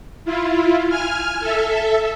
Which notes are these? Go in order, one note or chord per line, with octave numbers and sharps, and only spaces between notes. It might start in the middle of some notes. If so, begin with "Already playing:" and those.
E4 F4
G#5 F6
A4 E5